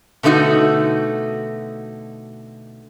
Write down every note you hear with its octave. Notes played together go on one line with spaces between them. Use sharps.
B2 D3 A3 D#4 F#4